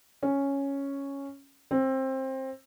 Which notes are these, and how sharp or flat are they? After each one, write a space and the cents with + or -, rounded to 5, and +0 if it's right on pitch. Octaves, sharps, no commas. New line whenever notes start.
C#4 +0
C4 +20